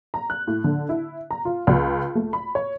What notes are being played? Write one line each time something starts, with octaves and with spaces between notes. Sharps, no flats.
A#5
F#6
A2
D3
E4
A#5
F4
C#2
A3
B5
C#5